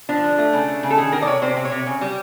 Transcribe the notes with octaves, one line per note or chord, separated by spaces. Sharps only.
F3 D4
D3
A3
C#3
A3
C#3
A4
D#3 G#4
D#3 A#4
D5
C3 C#5
C3 C5
C3
C#5
C3
C#3
G3